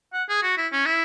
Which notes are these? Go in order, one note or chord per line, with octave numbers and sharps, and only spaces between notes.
F#5
G#4
F#4
E4
C#4
E4